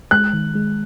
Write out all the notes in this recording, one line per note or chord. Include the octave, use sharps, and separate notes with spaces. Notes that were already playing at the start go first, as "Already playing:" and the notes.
G#3 F#6
D#3
G#3